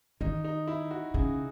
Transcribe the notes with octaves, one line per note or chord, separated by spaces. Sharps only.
D#3 D#4
D#4
E4
F#4
C#3 G#4